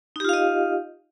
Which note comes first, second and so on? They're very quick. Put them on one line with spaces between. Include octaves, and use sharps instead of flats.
D#4 G4 F4 F5 D#5